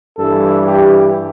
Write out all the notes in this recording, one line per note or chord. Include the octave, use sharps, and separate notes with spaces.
G2 E3 A4
G4